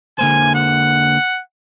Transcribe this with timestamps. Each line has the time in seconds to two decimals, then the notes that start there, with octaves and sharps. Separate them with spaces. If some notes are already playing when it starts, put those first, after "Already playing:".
0.19 D3 A#3 C5 G#5
0.55 F#5